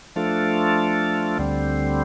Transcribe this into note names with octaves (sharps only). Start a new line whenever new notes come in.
F3 A3 D4 F4 A4
D2 D3 G3 C4